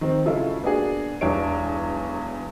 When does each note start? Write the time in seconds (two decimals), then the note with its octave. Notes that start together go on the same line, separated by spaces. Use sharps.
0.01 D#3 C4
0.25 C#3 F#3 G#3 E4 F4 A4
0.62 A#3 B3 D4 F#4 G#4
1.21 E1 B1 E2 D4 C#5 D7